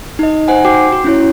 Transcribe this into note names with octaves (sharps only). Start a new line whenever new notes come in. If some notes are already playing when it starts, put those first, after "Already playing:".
D#4 D#5
D#4 C5 F#5 G#5
F#4 G5 D6
F#4
C#4 E4 C#5